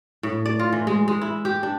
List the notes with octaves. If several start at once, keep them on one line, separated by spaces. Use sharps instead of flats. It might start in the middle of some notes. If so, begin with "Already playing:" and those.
A2
D5
F4
E3
G#3
G#3
E4
G4
D4